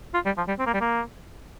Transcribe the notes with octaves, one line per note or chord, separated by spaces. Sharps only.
F4
G3
F3
G3
C4
A#3
G3
A#3